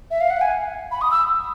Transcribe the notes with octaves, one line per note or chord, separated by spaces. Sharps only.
E5
F5
F#5
G#5
B5
D#6
E6